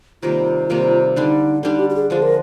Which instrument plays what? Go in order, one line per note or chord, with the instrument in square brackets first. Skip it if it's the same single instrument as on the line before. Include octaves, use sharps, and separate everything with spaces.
[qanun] C3 D#3 G3 A#3 [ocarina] F4
[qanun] C3 D#3 G3 A#3
[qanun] D3 G3 D4 [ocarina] D#4
[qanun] D3 G3 D4 [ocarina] D#4
[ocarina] G4
G4
G#4
[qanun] D3 F3 G#3 D4 [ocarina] G#4
[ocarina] A#4